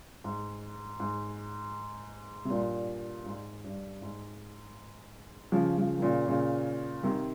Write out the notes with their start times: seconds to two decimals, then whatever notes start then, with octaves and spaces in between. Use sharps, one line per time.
0.24 G#2
1.00 G#2
2.45 C3
2.50 G2 A#2
3.26 G#2
3.64 G2
4.02 G#2
5.52 C#3 F3
5.78 C#3 F3
5.98 D#3
6.02 A#2 C#3
6.28 A#2 C#3
7.03 C3 D#3